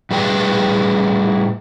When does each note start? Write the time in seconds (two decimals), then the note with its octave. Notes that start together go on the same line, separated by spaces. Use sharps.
0.11 A2 G3 G#4 B4 G5